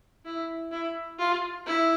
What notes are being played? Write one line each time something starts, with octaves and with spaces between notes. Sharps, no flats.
E4
E4
F4
E4